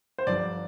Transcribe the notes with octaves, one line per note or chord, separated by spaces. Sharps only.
C5
G1 G2 D3 F3 D5